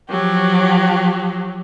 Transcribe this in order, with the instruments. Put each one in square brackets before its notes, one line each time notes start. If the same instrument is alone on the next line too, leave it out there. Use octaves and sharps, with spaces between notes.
[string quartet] F3 F#3 G4